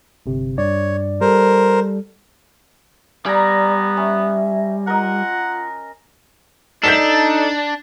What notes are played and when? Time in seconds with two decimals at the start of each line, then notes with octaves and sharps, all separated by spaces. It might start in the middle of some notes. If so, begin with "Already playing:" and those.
0.26 G1 C3
0.58 G2 C#5 D5
1.21 G3 A4 A#4 C5
3.26 G3 B3 D5 G#5 A#5
3.97 C#4 E5
4.87 F4 A#4 D#5 F#5
6.83 D4 D#4 A4 G6 B6 E7